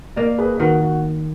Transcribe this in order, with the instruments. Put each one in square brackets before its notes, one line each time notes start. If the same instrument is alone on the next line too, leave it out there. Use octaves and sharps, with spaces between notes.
[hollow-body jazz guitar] A#3 [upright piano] A#4 D5
[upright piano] G#4 B4
B4
[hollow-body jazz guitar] D#3 [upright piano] F#4 A#4
[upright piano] F#4